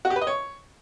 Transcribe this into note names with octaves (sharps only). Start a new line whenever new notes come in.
F#4
G4
B4
D#5
C#5